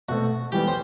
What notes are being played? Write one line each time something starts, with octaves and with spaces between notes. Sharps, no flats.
B2 A3 C4 F#4
E3 G3 B3 G4
C5